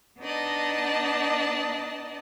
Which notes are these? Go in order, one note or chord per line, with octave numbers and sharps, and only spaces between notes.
B3 D4 D#4 D5 D#5 A5